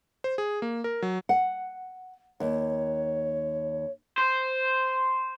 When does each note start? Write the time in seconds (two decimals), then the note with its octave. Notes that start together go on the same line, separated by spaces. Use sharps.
0.24 C5
0.38 G#4
0.62 A#3
0.84 A#4
1.02 F#3
1.29 F#5
2.40 D#2 C#5
4.18 C5